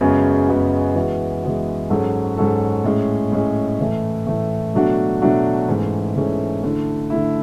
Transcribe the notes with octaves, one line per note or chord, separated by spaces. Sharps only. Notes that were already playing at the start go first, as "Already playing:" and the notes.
F#2 C#3 G#3 B3 F#4
F#2 C#3 G#3 B3 F#4
E3 G#3 B3 F#4
E3 G#3 B3 F#4
G#2 F#3 C#4 F#4 A4
G#2 F#3 C#4 F#4 A4
A2 G#3 C#4
A2 G#3 C#4
A2 E3 A3
A2 E3 A3
B2 F#3 A3 D4 F#4
B2 F#3 A3 D4 F#4
G#2 E3 A3 C#4
G#2 E3 A3 C#4
D3 A3 E4
D3 A3 E4